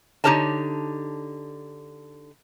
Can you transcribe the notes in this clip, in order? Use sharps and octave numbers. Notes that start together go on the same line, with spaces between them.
D3 D#4 G4 A#4 C#5 A5